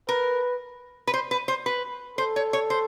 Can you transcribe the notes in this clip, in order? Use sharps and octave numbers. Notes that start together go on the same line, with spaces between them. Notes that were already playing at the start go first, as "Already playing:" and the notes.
A#4 B4
B4
C5
B4
C5
B4
A4 C5
C#5
C#5
C5